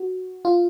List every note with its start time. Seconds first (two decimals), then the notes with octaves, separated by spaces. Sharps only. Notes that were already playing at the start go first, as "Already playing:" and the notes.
Already playing: F#4
0.45 F4